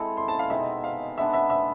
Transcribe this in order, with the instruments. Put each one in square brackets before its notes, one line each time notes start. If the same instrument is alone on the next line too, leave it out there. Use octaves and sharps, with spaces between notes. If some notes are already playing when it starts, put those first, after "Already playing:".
Already playing: [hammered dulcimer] G#3 C4 E4 A4
[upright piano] C6
A5
F5
[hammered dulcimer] B2 G#3 C4 D#4 [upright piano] E5
[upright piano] F5
[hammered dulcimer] G#3 B3 D4 [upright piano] E5
[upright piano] E5
E5